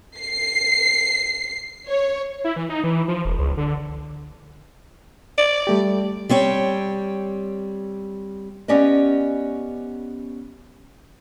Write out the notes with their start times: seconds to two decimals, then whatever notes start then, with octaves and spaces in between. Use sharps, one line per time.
0.19 C7
1.87 C#5
2.44 E4
2.56 E3
2.69 D#4
2.84 E3
3.08 F3
3.25 E1
3.38 C#2
3.57 D3
5.38 D5
5.67 G3 A3 G4
6.29 G3 C4 C#5 G5
8.68 B3 C#4 G4 D5 D#5